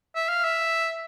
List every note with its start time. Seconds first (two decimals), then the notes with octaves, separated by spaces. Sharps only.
0.16 E5
0.29 F5
0.44 E5